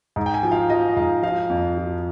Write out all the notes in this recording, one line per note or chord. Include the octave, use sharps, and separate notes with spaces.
G#2
G5
G#5
F3
F5
F3 D#5
G#2 F5
F3 F5
F2
F3